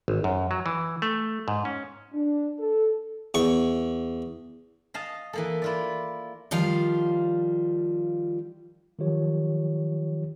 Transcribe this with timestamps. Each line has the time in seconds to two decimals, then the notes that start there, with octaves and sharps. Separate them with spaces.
0.08 G#1
0.24 F#2
0.51 F#3
0.66 E3
1.02 A3
1.48 G#2
1.65 C#4
2.14 D4
2.59 A4
3.34 E2 C#6
4.94 D#5 F5 A5
5.33 E3 A#3 A4
5.62 E4 F4 D5
6.51 D#3 F3 G3 F4 F5
8.99 D#3 F3 F#3 F4 G4 C#5